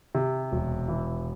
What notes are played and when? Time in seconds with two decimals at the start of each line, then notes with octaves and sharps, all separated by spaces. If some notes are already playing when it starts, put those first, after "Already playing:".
0.15 C3
0.52 E1
0.88 E3